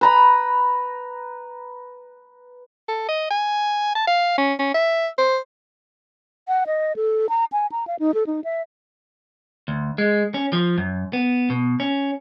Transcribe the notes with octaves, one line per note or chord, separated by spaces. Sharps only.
B4 A#5 B5
A4
D#5
G#5
A5
F5
C#4
C#4
E5
C5
F#5
D#5
A4
A#5
G#5
A#5
F5
D#4
A4
D#4
E5
D2
G#3
C#4
F3
F#2
B3
B2
C#4